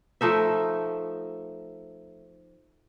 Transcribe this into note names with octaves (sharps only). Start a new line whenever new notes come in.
F3 A3 D#4 E5